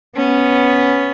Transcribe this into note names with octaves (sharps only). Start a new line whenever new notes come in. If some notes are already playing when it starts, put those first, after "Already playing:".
B3 C#4